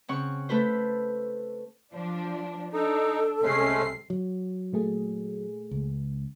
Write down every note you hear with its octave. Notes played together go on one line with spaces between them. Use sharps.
C#3 C4 F#5 C#6
A3 A4 B4 C5
F3 D4
D4 D#4 A4
C2 C3 G#3 A3 C#4 C7
F#3
A#2 A3 G#4
C#2